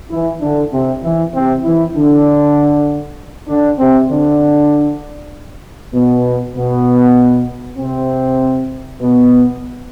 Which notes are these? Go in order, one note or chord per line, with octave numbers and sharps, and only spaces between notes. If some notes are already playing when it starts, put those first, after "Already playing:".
E3 E4
D3 D4
C3 C4
E3 E4
C3 C4
E3 E4
D3 D4
D3 D4
C3 C4
D3 D4
B2 B3
B2 B3
C3 C4
B2 B3